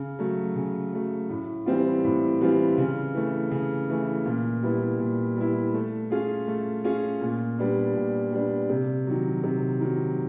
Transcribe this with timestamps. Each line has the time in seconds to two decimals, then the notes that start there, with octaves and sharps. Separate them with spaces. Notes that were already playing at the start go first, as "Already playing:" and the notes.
Already playing: C#3
0.19 F#3 A3
0.56 C#3
0.93 F#3 A3
1.30 A2
1.66 E3 G3 C4 F4
2.04 A2
2.41 E3 G3 C4 F4
2.78 C#3
3.15 E3 A3
3.51 C#3
3.89 E3 A3
4.25 A#2
4.62 G3 B3 E4
4.99 A#2
5.36 G3 B3 E4
5.74 A3
6.10 C#4 F4 G#4
6.48 A3
6.84 C#4 F4 G#4
7.21 A#2
7.59 G3 B3 D4
7.95 A#2
8.32 G3 B3 D4
8.70 C3
9.07 D#3 F#3
9.44 C3
9.81 D#3 F#3